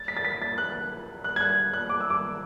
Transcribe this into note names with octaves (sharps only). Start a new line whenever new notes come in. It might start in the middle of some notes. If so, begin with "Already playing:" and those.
Already playing: A6
B6
A6
B6
A6
F#6
F#6
G#6
F#6
F#6
D6
E6
D6